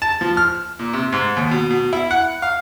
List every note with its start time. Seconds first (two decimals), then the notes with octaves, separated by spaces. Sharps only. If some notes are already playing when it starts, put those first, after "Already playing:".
0.02 A5
0.21 F3
0.37 F6
0.79 A#2
0.93 C3
1.12 G#2
1.37 D#2
1.51 B2
1.70 B2
1.93 E4
2.11 F#5
2.42 F5